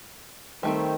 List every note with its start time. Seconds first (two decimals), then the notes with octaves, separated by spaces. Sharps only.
0.63 D#3 G3 A3 C4